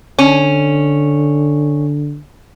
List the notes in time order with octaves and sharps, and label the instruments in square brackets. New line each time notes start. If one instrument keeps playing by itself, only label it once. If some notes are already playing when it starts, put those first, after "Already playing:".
[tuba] D3 [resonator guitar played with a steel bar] C#4